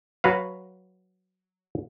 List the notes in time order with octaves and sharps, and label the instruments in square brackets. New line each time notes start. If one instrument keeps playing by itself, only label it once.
[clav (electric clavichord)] F#3 F#4 B4 F5